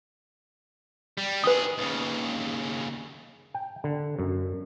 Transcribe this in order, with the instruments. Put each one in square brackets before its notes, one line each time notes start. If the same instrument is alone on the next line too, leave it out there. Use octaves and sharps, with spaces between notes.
[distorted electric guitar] G3
[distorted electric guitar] D#3 G#4 [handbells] B4 D#6
[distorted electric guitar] D#2 C#3
[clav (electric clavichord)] G5
D3
F#2